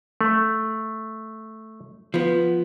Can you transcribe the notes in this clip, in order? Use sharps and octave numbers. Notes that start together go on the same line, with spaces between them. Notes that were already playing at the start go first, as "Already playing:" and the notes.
A3
F3 B3